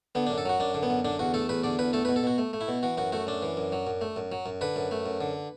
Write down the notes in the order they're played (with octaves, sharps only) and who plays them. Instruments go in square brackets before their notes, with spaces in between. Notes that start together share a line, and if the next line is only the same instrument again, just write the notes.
[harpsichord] D3 B3
D4
F#2
A4
F#3 F#4
F#2 D4
D3
B3
F#2
D3 D4
E2 F#4
A3 A4
E2 B4
D3 D5
E2 B4
A3 A4
B4
B2
A4
B2 F#4
A3
A3
E4
B2
E3 F#4
F#2 F#4
A3 F#4
F#2 D4
E3
F#2
F#3
F#2
A3
F#2
F#3
F#2
D3 B4
F#2
A3
F#2
D3